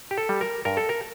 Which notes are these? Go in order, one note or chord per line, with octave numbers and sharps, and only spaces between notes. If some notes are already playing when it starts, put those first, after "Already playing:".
G4
A4
G3
A#4
G2 A#4
A4
A#4